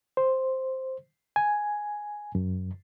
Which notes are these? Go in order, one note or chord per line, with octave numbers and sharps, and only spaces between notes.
C5
G#5
F#2